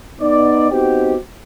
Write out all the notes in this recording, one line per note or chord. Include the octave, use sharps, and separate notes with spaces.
B3 D#4 D5
B3 C4 D#4 F#4 G4